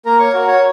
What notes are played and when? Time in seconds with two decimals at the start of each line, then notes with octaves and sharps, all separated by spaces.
0.06 A#3 A#4 A#5
0.19 C#5 C#6
0.33 F#4 A#4
0.47 C#5